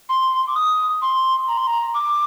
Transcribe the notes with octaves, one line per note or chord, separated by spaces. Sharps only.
C6
D6
D#6
C6
A#5
C6
A#5
D6